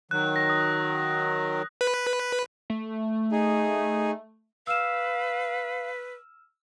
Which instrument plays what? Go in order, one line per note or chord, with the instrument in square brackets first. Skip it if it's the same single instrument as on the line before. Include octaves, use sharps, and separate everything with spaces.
[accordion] D#3 F#3 [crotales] F#6
[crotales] A#6
D#6
[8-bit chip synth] B4
[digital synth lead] A3
[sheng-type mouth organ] D#4 G#4
[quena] B4 [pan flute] F5 [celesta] E6 F6 E7